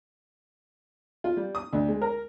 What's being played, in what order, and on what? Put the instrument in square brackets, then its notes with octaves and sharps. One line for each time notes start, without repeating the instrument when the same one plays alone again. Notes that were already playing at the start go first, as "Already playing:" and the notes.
[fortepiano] F4
G3
D#6
D2
G#3
A#4